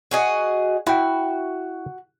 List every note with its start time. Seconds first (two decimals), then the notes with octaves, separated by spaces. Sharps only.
0.11 F#4 G#4 D#5
0.87 E4 F#4 G5